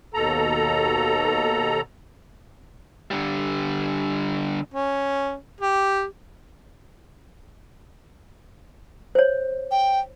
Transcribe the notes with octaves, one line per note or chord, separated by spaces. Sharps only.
D#2 B2 A4 A#5
D3 G3
C#4
G4
C5 C#5
G5